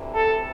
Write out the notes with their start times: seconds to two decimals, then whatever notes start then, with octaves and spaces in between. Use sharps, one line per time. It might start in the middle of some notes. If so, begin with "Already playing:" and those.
Already playing: D2 C3 E3
0.14 A4